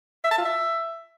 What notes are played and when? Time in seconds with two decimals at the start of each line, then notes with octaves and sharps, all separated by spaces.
0.24 E5
0.31 A5
0.38 F4
0.45 E5